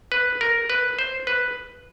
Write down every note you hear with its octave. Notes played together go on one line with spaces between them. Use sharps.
B4
A#4
B4
C5
B4